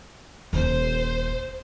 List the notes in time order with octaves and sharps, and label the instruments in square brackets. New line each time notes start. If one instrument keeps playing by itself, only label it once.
[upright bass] D#1 [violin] C5